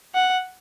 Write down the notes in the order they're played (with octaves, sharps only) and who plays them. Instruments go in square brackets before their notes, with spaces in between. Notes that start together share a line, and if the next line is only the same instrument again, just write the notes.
[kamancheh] F#5